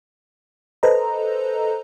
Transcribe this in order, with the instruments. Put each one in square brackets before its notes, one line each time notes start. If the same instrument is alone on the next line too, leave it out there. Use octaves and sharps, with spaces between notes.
[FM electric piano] A4 B4 C5 D#5 A#5